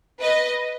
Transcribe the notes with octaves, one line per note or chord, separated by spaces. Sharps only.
B4 D#5